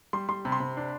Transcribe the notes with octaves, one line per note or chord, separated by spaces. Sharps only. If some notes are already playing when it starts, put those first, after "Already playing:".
G3 C6
G3 C6
C3 B5
C6
C3 B5
D4